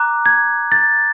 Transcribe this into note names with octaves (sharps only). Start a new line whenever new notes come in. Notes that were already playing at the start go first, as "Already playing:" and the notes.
Already playing: A#5 D6 F#6
G#6
A6